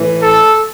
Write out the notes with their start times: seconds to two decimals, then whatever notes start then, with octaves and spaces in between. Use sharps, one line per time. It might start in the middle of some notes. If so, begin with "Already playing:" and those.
Already playing: A2 E3
0.23 A4